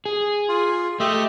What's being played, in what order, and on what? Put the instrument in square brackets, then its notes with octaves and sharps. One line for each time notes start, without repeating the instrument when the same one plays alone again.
[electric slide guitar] G#4
[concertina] F4
[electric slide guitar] A3 [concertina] G4 D#5 E5